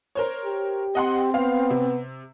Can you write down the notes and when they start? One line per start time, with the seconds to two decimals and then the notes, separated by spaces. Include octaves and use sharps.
0.15 A#4 C5 C#5
0.45 G4
0.95 C4 D#5 F#5 C6
1.34 B3 F5
1.70 C3